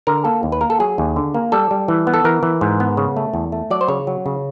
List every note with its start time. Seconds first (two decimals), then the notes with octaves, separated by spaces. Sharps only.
0.07 D3 A#4
0.25 A#3 A4
0.43 D#2
0.52 B4
0.61 A#3 A#4
0.70 A4
0.80 F#3 G#4
0.98 D#2
1.16 D3
1.34 A#3
1.52 G3 A4
1.71 G3
1.88 E3
2.07 B3
2.14 A4
2.24 E3 A#4
2.43 E3
2.61 G#2
2.80 B3
2.97 C#3
3.17 A3
3.34 E2
3.52 A3
3.71 F#3 D5
3.81 C5
3.88 C#3 C#5
4.07 F#3
4.26 C#3